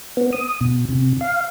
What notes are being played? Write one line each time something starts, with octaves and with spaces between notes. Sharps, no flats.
B3
D#6
B2
C3
F5